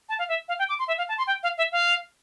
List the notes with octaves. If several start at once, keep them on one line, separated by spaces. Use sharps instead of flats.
A5
F5
E5
F5
G5
D6
C6
E5
F5
A5
C6
G5
F5
E5
F5